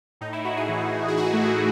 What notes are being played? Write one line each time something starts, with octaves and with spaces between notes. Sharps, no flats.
A2 D#4
E4
A2 F#4
G#4
E3
E3
G#4
E3 F#4
A3
E3
A3